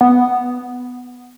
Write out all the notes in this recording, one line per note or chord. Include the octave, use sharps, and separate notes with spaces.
B3